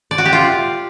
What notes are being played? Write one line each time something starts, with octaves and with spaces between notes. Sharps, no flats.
D5
F#4
G4
F4